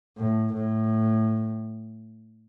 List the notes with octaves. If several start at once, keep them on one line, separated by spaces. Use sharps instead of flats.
A2
A2